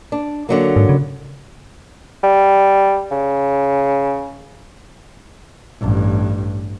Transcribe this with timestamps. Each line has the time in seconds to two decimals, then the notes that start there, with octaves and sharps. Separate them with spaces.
0.12 D4
0.49 D3 F#3 A#3
0.76 G#2
0.89 C#3
2.23 G3
3.11 C#3
5.80 A1 G2